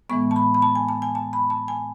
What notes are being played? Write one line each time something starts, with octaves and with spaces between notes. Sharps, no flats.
A2 E3 G#3 B3 C#6
A5
B5
B5
A5
G#5
A5
G#5
A5
B5
A5
G#5